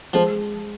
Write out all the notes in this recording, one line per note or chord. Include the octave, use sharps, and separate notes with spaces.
F3 G#3